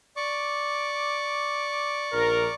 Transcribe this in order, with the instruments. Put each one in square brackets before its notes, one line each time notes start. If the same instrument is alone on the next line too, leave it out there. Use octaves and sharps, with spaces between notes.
[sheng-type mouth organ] D5 C#6 D6
[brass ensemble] A#1 A#4